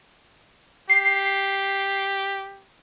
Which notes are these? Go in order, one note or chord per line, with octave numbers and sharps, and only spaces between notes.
G4 C7